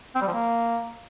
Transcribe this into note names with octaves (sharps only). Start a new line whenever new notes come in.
C4
G3
F3
A#3